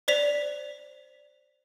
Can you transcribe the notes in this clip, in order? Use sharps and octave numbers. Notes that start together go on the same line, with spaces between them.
C5 D5 B6 F7